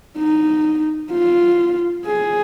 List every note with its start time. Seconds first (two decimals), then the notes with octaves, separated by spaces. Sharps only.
0.17 D#4
1.12 F4
2.06 G#4